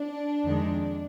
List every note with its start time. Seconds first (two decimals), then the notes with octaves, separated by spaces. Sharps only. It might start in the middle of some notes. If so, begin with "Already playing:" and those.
Already playing: D4
0.45 F2 D#3 G#3